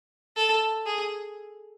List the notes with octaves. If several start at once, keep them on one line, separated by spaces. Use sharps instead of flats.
A4
G#4